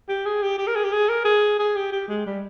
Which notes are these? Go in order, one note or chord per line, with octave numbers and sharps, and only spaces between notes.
G4
G#4
G4
G4
A#4
G#4
G4
G#4
A#4
G#4
G#4
G4
G4
G#3
G3